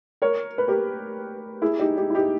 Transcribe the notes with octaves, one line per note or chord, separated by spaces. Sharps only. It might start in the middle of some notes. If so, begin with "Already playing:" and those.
A#4 C#5
B4
G4 A#4
E4 G#4
D#4 G4
D#4 G4
E4
D#4 G4